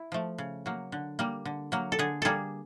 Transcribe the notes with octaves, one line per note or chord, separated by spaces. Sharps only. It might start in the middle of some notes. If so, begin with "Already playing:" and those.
Already playing: E4
F3 A3
C#3
F#3 A#3
D3
G3 A#3
D3
F#3 A#3
A4
D3 G#4
G3 A#3 G#4 A4